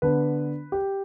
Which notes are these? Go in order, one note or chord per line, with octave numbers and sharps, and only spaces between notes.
D3 B3 D4 B4
G4